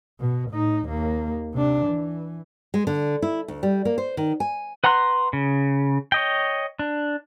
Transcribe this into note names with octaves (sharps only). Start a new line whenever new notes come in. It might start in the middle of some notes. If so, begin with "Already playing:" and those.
B2
A2 D#4
D#2 A#3
C3 D4
E3
G#3
D3
E4
D2
G3
A#3
C5
D#3
G#5
B4 F#5 A#5 C6 F#6
C#3
C#5 D#5 G5
D4